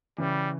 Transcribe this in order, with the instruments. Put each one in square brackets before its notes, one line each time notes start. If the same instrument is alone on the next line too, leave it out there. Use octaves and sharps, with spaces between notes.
[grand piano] C#3 E3 [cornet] G3